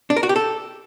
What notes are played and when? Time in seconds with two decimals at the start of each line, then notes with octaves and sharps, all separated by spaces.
0.10 D4
0.16 A#4
0.23 F#4
0.29 G4
0.36 A4